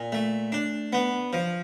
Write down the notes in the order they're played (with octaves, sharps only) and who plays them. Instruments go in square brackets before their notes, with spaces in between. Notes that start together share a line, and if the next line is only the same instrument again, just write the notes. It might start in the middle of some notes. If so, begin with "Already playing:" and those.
Already playing: [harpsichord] A#2
A3
D4
B3
F3